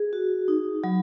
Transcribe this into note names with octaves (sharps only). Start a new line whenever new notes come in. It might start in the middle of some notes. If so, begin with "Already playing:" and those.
Already playing: G#4
F#4
D#4
F#3